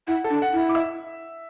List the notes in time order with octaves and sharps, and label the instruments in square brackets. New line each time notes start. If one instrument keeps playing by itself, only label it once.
[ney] E4 [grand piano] F#5
[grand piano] A4 A5
[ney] D4
[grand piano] F#5
[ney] E4
[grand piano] F#5
D6
E5 E6